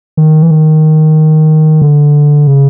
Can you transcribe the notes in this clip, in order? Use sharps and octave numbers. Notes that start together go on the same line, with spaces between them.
D#3
E3
D#3
D3
C#3